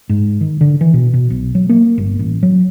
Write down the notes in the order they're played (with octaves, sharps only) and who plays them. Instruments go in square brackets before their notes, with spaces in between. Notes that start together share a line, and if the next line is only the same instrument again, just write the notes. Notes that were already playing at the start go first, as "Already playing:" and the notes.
[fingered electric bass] G#2
D#3
D3
E3
B2
B2
B1
F#3
A#3
G1
A1
F#3